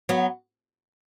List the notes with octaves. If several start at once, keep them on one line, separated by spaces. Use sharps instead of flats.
F#3 B3